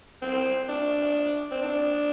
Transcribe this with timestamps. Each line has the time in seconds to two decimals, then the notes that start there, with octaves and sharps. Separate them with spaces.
0.22 C4
0.69 D4
1.51 C4
1.62 D4